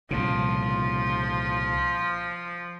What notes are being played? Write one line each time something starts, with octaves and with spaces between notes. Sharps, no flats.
C2 A#2 C#3 F3